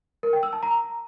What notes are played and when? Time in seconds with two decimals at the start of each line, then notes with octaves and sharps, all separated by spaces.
0.23 A#4
0.33 G5
0.43 E6
0.53 A5
0.63 A#5